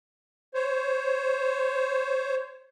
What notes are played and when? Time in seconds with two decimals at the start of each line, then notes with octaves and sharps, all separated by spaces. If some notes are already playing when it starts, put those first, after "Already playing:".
0.54 C5 C#5